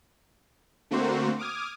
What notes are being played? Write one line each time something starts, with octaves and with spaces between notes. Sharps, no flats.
D3 A3 A#3 C4 F#4 C5
D6 D#6 F6 G#6